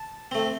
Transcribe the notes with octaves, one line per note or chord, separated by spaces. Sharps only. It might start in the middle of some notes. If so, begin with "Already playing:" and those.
Already playing: A5
A3 C4